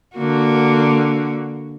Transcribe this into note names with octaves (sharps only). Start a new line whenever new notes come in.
D3 A#3 F#4